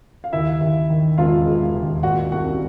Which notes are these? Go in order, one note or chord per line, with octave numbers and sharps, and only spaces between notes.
F5
D#2 E4 E5
D#2
D#3
E1 F4 F5
G#3
D#2
A#2 F#4 F#5
C2 F#4 F#5